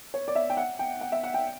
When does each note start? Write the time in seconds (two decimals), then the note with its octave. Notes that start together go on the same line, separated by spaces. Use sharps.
0.14 C#5
0.28 D5
0.35 E5
0.50 G5
0.57 F#5
0.79 G5
1.01 F#5
1.12 E5
1.23 F#5
1.34 G5